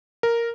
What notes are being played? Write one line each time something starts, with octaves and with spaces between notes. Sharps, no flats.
A#4